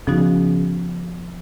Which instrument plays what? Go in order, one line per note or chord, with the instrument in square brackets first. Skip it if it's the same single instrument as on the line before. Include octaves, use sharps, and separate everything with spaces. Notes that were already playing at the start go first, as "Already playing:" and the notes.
[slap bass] C#3 [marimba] F3 B3 D#4 F#4